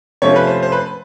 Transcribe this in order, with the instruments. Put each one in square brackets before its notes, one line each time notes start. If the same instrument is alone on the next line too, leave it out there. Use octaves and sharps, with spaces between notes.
[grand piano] C3 F3 A3 C#4 C#5
B4
C5
C5
B4